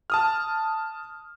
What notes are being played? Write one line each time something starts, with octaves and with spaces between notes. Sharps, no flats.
A5 D#6 F6